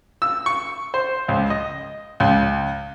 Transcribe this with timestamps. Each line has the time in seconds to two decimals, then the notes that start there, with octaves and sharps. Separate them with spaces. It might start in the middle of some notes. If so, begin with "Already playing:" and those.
0.22 E6
0.46 C#6
0.94 C5
1.28 C#2
1.50 D#5
2.20 C#2